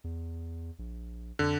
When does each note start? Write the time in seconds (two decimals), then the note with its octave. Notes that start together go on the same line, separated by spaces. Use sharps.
0.04 E2
0.79 A#1
1.39 F2 D3